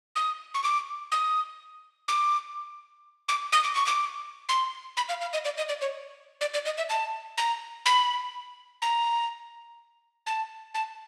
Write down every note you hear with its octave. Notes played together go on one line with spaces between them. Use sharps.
D#6
C#6
D6
D#6
D6
D6
D#6
D6
C#6
D6
C6
B5
F5
F5
D#5
D5
D#5
D5
C#5
D5
D5
D#5
E5
A5
A#5
B5
A#5
A5
A5